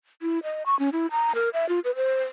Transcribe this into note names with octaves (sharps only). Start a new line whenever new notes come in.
E4
D#5
C#6
C#4
E4
A#5
A#4
E5
F4
B4
C5